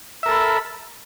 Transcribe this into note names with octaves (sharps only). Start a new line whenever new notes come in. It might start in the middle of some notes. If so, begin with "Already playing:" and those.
A4 A#4 E5 B5